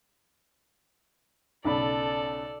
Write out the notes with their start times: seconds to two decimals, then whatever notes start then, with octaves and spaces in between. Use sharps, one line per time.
1.65 B1 C#3 A4 D5 B5